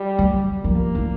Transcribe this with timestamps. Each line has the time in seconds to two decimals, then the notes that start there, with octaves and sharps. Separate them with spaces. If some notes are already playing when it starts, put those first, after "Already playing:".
Already playing: G3
0.19 F#3
0.64 F3 A#3
0.95 E3